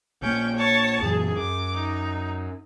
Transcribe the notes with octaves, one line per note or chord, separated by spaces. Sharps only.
A#1 A#3 C#4 G5
C#5 A5
F#2 A#2 E3 G#4
F#2 D6
D#4